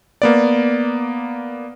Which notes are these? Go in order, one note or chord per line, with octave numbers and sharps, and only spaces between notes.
A#3 B3 D5